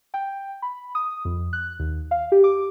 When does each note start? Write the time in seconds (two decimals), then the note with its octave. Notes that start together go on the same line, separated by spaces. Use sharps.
0.14 G5
0.62 B5
0.95 D#6
1.25 F2
1.53 F#6
1.79 D#2
2.11 F5
2.32 G4
2.44 D6